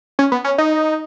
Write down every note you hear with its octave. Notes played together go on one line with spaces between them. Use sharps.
C#4
B3
C#4
D#4